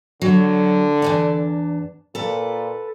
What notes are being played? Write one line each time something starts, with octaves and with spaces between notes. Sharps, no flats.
D3 F#3
E2 G#2 D4
A#2 A4 B4